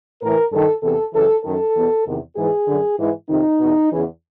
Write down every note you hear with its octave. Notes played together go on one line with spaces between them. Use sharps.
A2 E3 A#4
G2 D#3 A4
E2 C3 E3 A4
F#2 C#3 E3 A4
F#2 D#3 A4
E2 B2
E2 C3 D#3
G#2 E3 G#4
F#2 D3
G#2 E3
F2 C3 D#3 D#4
E2 B2
E2 C#3 E3